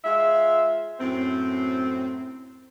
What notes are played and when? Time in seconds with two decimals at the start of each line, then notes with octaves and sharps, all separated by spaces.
0.04 G#3 F4 E5
1.00 F#2 A2 C4